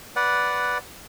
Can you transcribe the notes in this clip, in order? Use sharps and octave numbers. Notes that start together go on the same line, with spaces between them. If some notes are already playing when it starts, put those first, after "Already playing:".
B4 D5 F#5